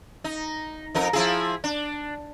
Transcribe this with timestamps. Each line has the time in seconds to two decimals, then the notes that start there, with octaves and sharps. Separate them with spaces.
0.24 D#4
0.95 F2 D#4 A#4
1.13 F3 E4 G#4
1.64 D4